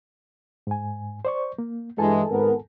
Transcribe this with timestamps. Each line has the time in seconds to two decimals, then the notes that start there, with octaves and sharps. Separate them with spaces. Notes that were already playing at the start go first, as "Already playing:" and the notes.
0.67 G#2 G#5
1.25 C5 D5 C#6
1.58 A#3
1.98 G2 E3 G#3 A4 G#5 A5
2.30 G#1 B3 A#4